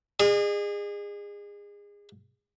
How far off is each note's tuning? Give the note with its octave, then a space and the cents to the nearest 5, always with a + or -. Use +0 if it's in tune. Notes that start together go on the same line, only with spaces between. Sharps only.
G#4 -25 D#5 -45